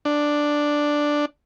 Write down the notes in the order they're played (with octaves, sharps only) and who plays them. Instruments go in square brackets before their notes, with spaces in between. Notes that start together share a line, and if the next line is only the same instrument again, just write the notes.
[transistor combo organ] D4